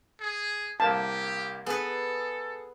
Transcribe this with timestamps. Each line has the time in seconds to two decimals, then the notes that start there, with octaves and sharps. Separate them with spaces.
0.21 G#4
0.80 C2 A#3 G4 F5 A5
1.66 B3 G#4 A4 B4